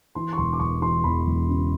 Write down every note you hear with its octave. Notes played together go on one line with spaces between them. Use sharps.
E3 C6
C#6
E1 C6
D6
E1 C#6
E3 C6
E2 B5
E1
C#3